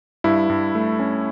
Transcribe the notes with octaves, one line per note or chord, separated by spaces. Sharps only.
G2 E4
G2
A3
C#4